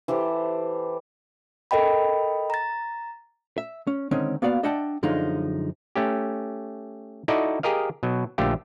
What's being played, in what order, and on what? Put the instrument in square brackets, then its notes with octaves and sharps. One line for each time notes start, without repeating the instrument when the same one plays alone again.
[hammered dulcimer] E3 G4 A4 C5
[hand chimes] A4 A#4 D#5 G5 B5
A#5 A6
[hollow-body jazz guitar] E5
C#4
D3 D#3 G#3 C4 C#4
A#3 B3 F#4 D5 F5
D4 D#5 E5 F#5 G5 A5
F#2 D3 F3 G#3 D#4
[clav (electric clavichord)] A3 C#4 G4
D#4 E4 F#4 A4 D5 D#5
G4 G#4 A#4 D#5 F5
B2 F#3
A#1 D3 A3 F4 G4